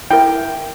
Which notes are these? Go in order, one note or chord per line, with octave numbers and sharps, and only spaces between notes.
E4 A#4 G5